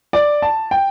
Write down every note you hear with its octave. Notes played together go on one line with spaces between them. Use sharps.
D5
A5
G5